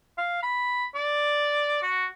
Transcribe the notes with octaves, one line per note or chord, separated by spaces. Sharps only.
F5
B5
D5
F#4